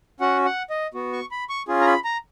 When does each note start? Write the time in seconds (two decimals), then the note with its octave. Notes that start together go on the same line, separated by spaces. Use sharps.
0.20 C#4 F#4 F#5
0.45 F#5
0.70 D#5
0.94 B3 F#4
1.13 C#6
1.31 B5
1.49 C#6
1.68 C#4 F4 G#4
1.81 A#5
1.87 B5
2.04 A#5